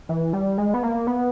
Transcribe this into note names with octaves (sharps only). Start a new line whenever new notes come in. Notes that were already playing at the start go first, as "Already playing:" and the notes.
E3
G3
G#3
B3
A#3
B3